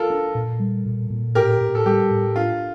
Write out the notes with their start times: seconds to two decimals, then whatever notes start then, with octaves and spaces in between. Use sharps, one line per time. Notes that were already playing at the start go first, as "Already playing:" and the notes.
Already playing: F4 A4 A#4
0.10 D4
0.35 A#2
0.60 G3
0.86 A#2
1.10 A#2
1.35 A2 G4 A#4
1.61 A2
1.75 A4
1.86 G3 G4
2.11 A2
2.35 D4 F4